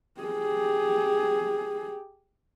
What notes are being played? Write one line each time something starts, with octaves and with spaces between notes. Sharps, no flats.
G4 G#4